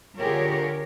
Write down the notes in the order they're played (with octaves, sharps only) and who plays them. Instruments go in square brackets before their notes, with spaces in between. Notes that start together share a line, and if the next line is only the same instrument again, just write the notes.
[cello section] D3 F4 G4 G#4 A#4 C#5